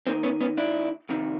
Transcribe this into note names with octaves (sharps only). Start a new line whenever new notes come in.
D#2 D#3 A#3 C4
B3 C#4
B3 C#4
D4 E4
F2 C3 D#3